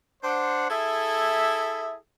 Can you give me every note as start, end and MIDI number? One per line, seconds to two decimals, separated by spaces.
0.23 0.69 62
0.23 0.69 72
0.23 0.69 78
0.70 1.96 64
0.70 1.96 68
0.70 1.96 69
0.70 1.96 76